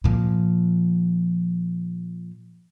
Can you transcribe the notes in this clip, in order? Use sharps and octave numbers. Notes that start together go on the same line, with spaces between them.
A#2 F3